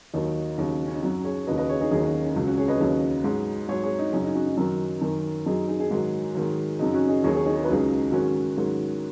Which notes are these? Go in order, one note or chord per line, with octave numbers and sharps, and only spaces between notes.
D#2 D#3 F#3 D#4
D#2 C#3 F#3
C#4
D#4
F#2 F#3 C#4 F#4
G#4 C#5
D#2 C#3 F#3 B4 D#5
B4 D#5
G#4 C#5
D#4 G#4
D#2 D#3 F#3 D#4 G#4
C#4 F#4
C#4
C#2 C#3 F#3
C#4 F#4
G#4 C#5
B4 D#5
D#2 C#3 F#3
G#2 F#3
G#2 F#3 G#4 C#5
G#4 C#5
D#4
F#2 C#3 F#3 C#4
D#4
C#4 F#4
D#4
F#2 D#3 F#3 D#4
F#2 D#3 F#3
F#2 F#3 D#4 G#4
D#4 G#4
D#4 G#4
G#2 D#3 F#3
G#2 D#3 F#3
F#2 C#3 F#3 D#4
C#4 F#4
D#4 G#4
D#2 D#3 F#3 G#4 C#5
G#4 C#5
D#4 G#4
G#4
B4
C#2 C#3 F#3 D#4 G#4
G#2 D#3 F#3 C#4 F#4
G#2 D#3 F#3